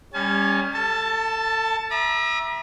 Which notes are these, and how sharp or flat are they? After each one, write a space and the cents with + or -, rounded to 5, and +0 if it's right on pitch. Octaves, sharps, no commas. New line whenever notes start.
G3 +25 C#4 +0 G#5 +45
A4 +30 A5 +0
E5 +0 A#5 +45 D#6 -45